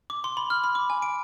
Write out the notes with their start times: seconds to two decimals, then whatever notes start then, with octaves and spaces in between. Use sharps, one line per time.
0.10 D6
0.24 C6
0.37 B5
0.50 F6
0.64 B5
0.75 D6
0.90 G#5
1.02 D7